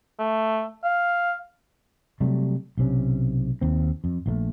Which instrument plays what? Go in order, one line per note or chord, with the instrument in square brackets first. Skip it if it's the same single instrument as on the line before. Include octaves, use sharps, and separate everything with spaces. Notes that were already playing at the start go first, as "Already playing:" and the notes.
[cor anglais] A3
F5
[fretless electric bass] C3 F#3 G3 A3
B1 C3 C#4
D#2 C4
F2
A#1 D#3 A3